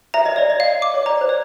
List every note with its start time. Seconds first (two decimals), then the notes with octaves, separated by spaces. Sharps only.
0.14 E5 A#5
0.25 D#5
0.36 C#5 D5
0.50 D#5
0.60 F5
0.82 D6
0.94 C#5
1.06 D5 A#5
1.21 C5
1.29 C#5